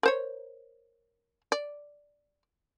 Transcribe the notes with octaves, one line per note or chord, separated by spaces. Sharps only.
A#4 C5 C#5
D5